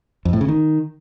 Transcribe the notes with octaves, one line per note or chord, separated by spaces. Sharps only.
F2
A2
C#3
D#3